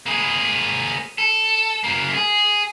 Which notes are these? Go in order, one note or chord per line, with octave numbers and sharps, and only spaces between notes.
A#3 G#4
A4
F#2 A#3
G#4